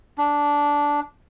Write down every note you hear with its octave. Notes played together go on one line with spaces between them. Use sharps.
D4